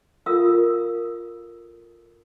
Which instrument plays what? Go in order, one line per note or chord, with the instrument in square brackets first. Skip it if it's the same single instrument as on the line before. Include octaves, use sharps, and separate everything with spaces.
[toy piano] F4 A4 A#4 F5 D#6 E6